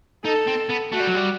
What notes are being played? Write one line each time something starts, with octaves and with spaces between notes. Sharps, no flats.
D#4 A4
C4
B3
A3 F#4
G3
F#3
G3